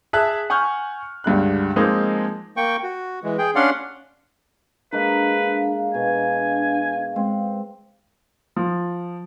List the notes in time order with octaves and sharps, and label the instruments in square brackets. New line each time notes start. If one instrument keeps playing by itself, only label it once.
[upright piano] G#4 E5 A5 F#6
F#5 G#5 C#6 F6 G6
C#2 G2 D3 F#6
F3 G#3 A#3 C4 D#4
[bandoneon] A#3 G5 C#6
F#4
E3 G#3
G#4 G5
C#4 D4 D5 F5 F#5 C6
[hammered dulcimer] G#3 A#3 [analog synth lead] D4 [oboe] B4 [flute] F5
[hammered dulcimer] B2 [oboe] G#5
[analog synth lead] G#3 [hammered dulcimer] C4
[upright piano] F3